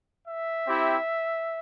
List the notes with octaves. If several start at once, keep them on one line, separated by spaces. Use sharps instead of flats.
E5
C4 E4 G4